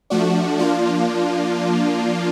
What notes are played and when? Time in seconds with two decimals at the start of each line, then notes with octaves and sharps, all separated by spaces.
0.10 F3 A3 D4 F#4
0.59 F3 A#3 D4 F4